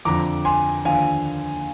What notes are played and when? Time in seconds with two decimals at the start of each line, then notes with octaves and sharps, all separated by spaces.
0.05 F2 D3 F3 A#5 D6
0.45 G#5 C6
0.85 D#2 D3 F3 F5 G#5